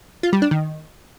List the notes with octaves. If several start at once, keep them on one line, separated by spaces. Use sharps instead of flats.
F4
G3
D4
D#3